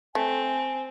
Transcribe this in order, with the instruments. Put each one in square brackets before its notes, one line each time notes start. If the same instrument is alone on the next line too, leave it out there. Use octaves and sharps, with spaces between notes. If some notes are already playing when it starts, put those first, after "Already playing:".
[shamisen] A3 [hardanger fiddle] C4 [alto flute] G#5